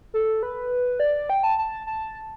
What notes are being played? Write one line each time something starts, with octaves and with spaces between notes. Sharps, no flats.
A4
B4
D5
G5
A5
A5
A5